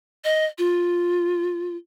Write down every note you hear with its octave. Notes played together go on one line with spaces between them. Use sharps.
D#5
F4